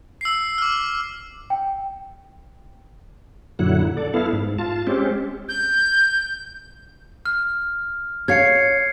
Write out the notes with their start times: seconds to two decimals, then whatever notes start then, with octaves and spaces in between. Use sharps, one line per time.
0.21 E6 C7
0.58 D6 F6
1.50 G5
3.59 F#2 A#2 D3 F#3 E4 F#5
3.97 A4 D5
4.14 B3 E4 A4 F5
4.33 G#2
4.59 F4 A5
4.87 G#3 C4 C#4 G4
5.49 G6
7.26 F6
8.28 C#5 F5 G#6 C7 C#7